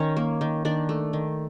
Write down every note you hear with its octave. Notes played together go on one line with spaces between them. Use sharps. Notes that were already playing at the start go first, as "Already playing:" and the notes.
Already playing: D#3 C#4 C#5
A#3
D#3
D#3 D4 D5
A3
D#3